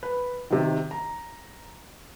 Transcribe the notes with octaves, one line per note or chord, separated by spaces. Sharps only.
B4
C3 D#3
A#5